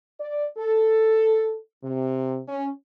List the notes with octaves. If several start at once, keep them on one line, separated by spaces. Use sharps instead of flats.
D5
A4
C3
C#4